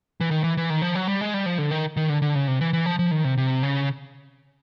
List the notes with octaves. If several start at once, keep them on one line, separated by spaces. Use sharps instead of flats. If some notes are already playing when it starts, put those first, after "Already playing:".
E3
D#3
E3
E3
D#3
F3
F#3
G3
G#3
G3
F3
D3
D#3
D#3
D3
D3
C#3
C3
E3
E3
F3
F3
D#3
C3
C3
C#3